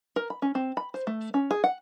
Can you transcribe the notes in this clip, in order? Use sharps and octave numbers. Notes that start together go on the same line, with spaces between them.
A#4
B5
C#4
C4
B5
C5
A3
C#4
G#4
F#5